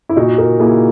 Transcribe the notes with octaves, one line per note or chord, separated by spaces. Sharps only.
E4
A#2 D#4 F#4
F#4 A#4
A#3 E4 G#4